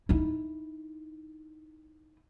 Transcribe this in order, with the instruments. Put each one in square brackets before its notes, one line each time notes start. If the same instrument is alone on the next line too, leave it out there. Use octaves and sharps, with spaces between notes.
[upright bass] D#4 E4